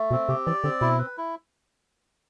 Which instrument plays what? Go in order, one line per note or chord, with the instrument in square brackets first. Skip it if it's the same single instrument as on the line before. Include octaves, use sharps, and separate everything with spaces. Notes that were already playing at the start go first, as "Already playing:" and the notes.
Already playing: [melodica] A3
[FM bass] B2 [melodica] C4
[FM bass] C3 [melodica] G4
[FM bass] E3 [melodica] D5
[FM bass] D3 [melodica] C4
[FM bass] B2 [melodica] E4
[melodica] B4
E4